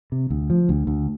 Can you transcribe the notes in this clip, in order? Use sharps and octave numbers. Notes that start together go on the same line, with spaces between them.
C3
D2
F3
D2
D2